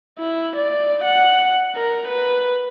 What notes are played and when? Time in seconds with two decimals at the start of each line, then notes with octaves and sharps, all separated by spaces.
0.19 E4
0.56 D5
1.04 F#5
1.76 A#4
2.08 B4